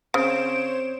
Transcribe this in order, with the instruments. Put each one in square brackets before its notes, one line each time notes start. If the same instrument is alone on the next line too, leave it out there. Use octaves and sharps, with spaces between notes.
[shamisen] C#3 [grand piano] C4 [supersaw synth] C5 C#5 E7 [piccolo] D7